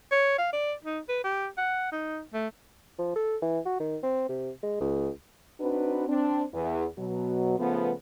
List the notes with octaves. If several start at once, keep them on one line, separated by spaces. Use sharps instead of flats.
C#5
F5
D5
D#4
B4
G4
F#5
D#4
A3
F3
A4
E3
F#4
D#3
C4
C3
G#3
C#2
C4 D4 D#4 F#4 B4
C4 D4
E2
B2 F#3
C#3 F3 A3 B3